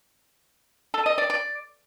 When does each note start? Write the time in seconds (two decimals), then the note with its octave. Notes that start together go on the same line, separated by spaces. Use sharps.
0.94 A4
1.06 D#5
1.18 D5
1.30 D5